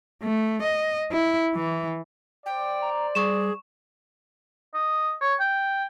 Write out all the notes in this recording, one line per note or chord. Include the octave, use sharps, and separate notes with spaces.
A3
D#5
E4
E3
C5 D5 G5
A#5
G3 G#4 C#6 E7
D#5
C#5
G5